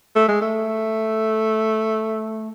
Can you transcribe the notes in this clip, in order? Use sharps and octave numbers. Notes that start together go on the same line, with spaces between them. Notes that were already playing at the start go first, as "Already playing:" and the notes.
A3
G#3
A3